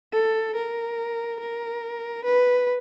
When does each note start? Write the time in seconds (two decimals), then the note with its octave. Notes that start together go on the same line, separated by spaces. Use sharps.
0.13 A4
0.55 A#4
1.40 A#4
2.25 B4